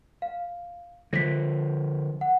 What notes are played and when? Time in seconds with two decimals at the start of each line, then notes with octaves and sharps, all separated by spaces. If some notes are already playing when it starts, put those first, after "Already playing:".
0.22 F5
1.13 D3 F3 A#6 B6
2.21 F#5